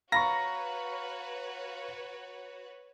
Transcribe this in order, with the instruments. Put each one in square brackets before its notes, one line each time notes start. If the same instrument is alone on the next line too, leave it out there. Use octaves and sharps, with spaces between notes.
[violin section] F#4 B4 C#5 [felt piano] F5 B5 C#6 [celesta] A#5 [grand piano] A#6